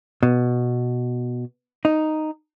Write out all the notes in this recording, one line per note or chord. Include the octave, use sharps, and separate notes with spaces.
B2
D#4